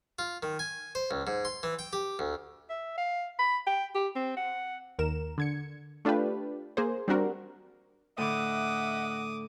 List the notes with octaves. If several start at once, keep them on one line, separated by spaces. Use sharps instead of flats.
F4
D#3
G#5
C5
C#2
G#2
C6
E3
G5
G4
D2
E5
F5
B5
G5
G4
C4
F#5
D#2 A#4 E7
D3 G#6 C#7
A3 D4 F4 G4 B4
A#3 G#4 C5
G3 C4 D4 F#4 A#4
A2 D3 D#5 E5 F#5 D6 D#6